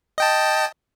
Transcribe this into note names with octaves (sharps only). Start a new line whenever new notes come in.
D#5 G5 A5